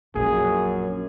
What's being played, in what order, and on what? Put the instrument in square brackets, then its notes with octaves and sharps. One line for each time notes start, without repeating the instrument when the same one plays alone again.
[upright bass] A#1 A#3 [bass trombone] F#2 [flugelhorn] G#4